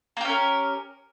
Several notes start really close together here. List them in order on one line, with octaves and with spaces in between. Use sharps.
A#3 G4 C#4 A#4